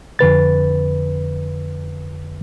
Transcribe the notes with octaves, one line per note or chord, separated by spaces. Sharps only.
F2 D3 B4 A6